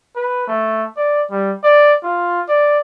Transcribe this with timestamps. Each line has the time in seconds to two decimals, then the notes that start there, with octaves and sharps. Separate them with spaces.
0.16 B4
0.47 A3
0.97 D5
1.30 G3
1.63 D5
2.03 F4
2.48 D5